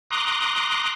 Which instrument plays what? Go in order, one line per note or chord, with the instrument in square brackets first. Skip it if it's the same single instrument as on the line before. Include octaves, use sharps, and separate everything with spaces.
[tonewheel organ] A#5 C6 D6 D#6 F#6